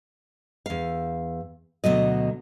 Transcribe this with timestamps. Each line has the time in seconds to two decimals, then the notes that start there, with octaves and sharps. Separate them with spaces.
0.66 E2 F5
1.84 D2 B2 F#3 D#5